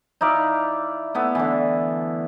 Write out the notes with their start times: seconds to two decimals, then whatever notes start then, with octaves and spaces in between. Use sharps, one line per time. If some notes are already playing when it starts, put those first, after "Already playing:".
0.21 D#4 E4 D5 F5
1.15 A3 B3 E4
1.35 D3 E3